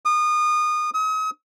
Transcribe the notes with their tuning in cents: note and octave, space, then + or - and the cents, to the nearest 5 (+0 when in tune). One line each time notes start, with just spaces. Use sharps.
D#6 -30
D#6 +40